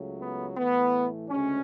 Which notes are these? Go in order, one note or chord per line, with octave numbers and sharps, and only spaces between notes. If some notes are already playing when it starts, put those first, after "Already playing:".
Already playing: C#2 C#3 F#3 A3
B3
A2 E3 A3 B3
D2 C#3 G#3 C#4